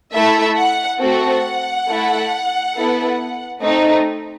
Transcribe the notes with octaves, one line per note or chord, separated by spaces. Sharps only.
A3 E4 A4 E5
F#5
A3 C4 F#4 A4 F#5
A3 E4 A4
B3 E4 A4
A3 C4 D#4